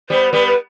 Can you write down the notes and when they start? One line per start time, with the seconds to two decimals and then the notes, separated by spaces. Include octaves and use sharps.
0.10 G3 B3 C5
0.32 G3 B3 B4
0.47 B4